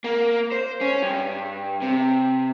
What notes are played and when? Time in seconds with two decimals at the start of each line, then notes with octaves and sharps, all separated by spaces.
0.04 A#3
0.52 C5
0.81 C#4
1.02 G2
1.82 C3